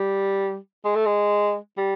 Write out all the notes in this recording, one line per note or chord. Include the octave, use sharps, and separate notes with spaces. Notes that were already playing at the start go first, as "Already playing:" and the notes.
Already playing: G3
G#3
A3
G#3
G3